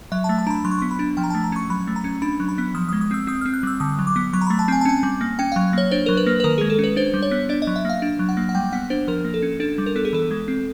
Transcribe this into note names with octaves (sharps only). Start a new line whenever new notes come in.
F#3 E5
A5
A3
A5
D4 A#5 B5
F#3 C6
C#6
B3 C6
B5
D4
F3 G5
A#5
A3 A5
A#5
C#4 C#6
F#3 B5
A3
A#5
C#4
D4 B5
F#3
B5
B3
F3 D#6
D#6
G#3
D#6
C4 E6
C4 D#6
F6
C4
F#6
G3 E6
D3 D#6
F#3
D6
B3
F#3 C#6
A#5
A3 B5
A5
C4 G#5
A5
C#4 G#5
G3
A#3
C#4 G5
F5
F#3
A#3 C#5
D4 C5
F#3 A#4
B4
A#3
B4
D#3 A#4
G#3 G#4
A4
C#4 B4
D4 C5
G3
C#5
B3
D4 D5
D#5
F#3
E5
A#3 F5
D4
F#3
F#5
A#3
F#5
G3 G5
B3 F#5
D4 C5
F3 A#4
A#3
A4
C#4
D4 A4
G3
A#4
B3 A4
G#4
E3 A4
G#3
C4